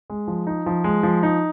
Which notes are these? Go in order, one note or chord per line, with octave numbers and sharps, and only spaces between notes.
G#3
F3
D#4
F3
G#3
F3
D#4